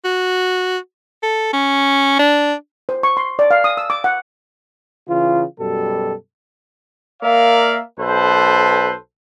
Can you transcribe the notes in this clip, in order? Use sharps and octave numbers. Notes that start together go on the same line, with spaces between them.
F#4
A4
C#4
D4
C5
C#6
C6
D5
F5
D#6
E6
D6
F#5
C#3 E3 F4
F#2 B2 G3 A4
A#3 A#4 D5 E5 F5
B1 A4 B4 C5